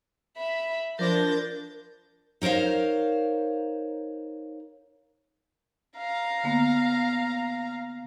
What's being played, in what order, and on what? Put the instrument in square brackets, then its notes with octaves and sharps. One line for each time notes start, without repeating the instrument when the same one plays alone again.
[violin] E5 B5
[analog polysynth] F3 D4 A#6 [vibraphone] A#4 [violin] G6 A6
[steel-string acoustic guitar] D#4 A#4 C5 C#5 F5
[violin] F5 A#5
[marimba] D3 A#3 B3